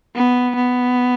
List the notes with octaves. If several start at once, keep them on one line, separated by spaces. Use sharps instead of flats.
B3
B3